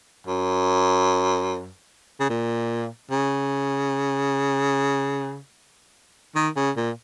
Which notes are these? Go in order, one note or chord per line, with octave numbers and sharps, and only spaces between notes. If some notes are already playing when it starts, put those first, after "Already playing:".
F#2
C#3
A#2
C#3
D#3
C#3
A#2